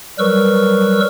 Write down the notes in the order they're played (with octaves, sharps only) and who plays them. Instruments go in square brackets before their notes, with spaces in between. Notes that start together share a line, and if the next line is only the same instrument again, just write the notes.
[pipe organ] F#3 G3 A#4 B4 C#6 E6